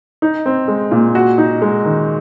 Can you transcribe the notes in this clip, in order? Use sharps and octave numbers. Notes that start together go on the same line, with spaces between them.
D#4
C4
G#3
A#2
F#4
D#4
G#3
D#3